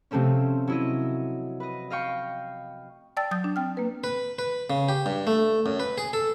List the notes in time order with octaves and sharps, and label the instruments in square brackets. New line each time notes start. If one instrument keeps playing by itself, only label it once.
[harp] C3 F3 A3 C4 C#4
F#3 E4 D#5
B4 D#5
D#5 F5 G5 C#6
[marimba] D5 G5 A5 E6 A6
F#3 D#6 G6 A6
D4
C4 G5 F6
A#3 B4
[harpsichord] B4
B4
C#3
G4
G2
A3
F#2
B4
G#4
A4